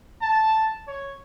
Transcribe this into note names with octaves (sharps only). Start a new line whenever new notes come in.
A5
C#5